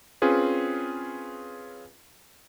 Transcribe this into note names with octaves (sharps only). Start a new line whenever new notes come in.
C4 C#4 F4 G#4 B4